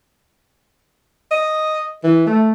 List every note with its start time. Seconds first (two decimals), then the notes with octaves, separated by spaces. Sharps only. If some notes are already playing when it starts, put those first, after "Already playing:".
1.31 D#5
2.04 E3
2.27 A3